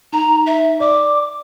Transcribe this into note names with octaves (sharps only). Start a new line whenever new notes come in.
D#4 A#5
E5
D5 D6